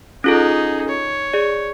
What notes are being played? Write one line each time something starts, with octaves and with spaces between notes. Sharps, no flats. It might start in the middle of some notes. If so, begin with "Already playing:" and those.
C#4 D#4 F4 G#4 A4
C#5
G#4 D5